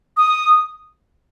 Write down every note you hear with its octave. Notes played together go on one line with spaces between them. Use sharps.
D#6